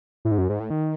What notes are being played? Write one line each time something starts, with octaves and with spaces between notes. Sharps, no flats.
A2
G#2
F#2
G#2
A2
D#3